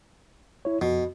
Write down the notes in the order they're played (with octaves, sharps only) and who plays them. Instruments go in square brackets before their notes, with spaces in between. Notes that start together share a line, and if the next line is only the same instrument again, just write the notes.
[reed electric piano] E4 C#5
[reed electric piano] F2 [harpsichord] B2